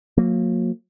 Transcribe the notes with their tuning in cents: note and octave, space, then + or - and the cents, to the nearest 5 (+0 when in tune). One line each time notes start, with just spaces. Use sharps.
F#3 -40 A#3 -20